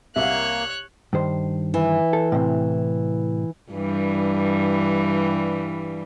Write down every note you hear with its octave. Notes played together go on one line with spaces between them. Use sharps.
C2 A#3 C#5 E5 F#5 F#6
G2 D#3 C5
E3
A4
A2 C3
G2 E3 G3